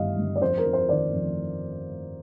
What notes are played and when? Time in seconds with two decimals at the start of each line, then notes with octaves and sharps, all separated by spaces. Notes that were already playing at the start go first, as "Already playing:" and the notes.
Already playing: G1 D#3 G3 D#5 F5
0.18 G1
0.36 D5
0.41 F2 C5
0.57 A#4
0.65 F2
0.73 C5
0.89 D#3 D5
1.13 F2